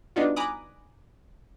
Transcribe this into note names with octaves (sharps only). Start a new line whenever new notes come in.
G3 B3 D4 D#4 F4 F#4
G#5 A#5 B5 D6 D#6 F#6